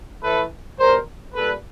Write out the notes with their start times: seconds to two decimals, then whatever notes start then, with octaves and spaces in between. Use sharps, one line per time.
0.22 A2 E3 A3 A4 B4
0.78 B2 G3 A#4 C5
1.34 A#2 G3 A4 B4